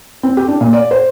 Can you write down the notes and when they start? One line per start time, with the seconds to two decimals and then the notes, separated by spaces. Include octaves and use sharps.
0.23 C4
0.37 G4
0.48 D4
0.61 A#2
0.73 D5
0.91 C5